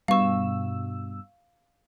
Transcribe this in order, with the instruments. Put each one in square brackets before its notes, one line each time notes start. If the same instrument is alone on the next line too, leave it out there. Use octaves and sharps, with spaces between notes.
[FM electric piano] G2 B2 E6 [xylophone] F5 C#6